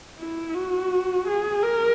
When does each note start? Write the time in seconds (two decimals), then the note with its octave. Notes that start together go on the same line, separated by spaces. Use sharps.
0.19 E4
0.54 F#4
1.28 G#4
1.63 A#4